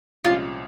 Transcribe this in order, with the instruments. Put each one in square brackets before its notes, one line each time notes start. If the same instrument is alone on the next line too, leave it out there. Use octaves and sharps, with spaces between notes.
[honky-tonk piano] C2 A#2 F3 G#3 C#4 [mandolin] F4